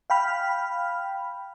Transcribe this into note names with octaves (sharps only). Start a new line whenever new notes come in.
F5 G5 B5 F6